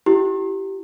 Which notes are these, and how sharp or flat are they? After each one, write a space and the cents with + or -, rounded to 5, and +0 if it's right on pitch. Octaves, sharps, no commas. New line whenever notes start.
E4 +25 G4 -20